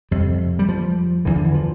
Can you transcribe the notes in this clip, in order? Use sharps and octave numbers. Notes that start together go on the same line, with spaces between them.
F2 C3 G3
G3
F3
E2 D3 E3
D3
E3
F3